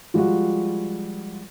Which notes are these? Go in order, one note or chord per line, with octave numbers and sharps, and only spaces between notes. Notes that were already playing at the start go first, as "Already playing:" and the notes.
F3 G3 G#3 F4 F#4